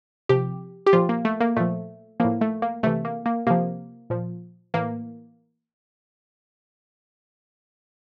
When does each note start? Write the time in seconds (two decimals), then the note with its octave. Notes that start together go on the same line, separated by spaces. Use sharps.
0.29 C3 F3 G4
0.86 G4
0.93 A#2 F3 F4
1.09 A#3
1.25 A3
1.41 A#3
1.56 A#2 F3 A3
2.20 A2 F3 A#3
2.41 A3
2.62 A#3
2.83 C3 E3 A3
3.05 A#3
3.26 A#3
3.47 C3 F3 A#3
4.10 A#2 F3
4.74 A2 E3 A#3